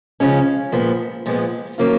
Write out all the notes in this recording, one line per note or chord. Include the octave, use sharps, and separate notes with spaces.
C#3 F3 G#3 C#4
A#2 F3 G#3 B3
A#2 F3 G#3 B3
D#3 F#3 A#3 C#4 F4